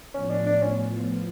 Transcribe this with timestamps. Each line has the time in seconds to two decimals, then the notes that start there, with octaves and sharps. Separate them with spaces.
0.14 A2 F3 B3 C#4 F4
0.30 D4
0.46 D4
0.63 C#4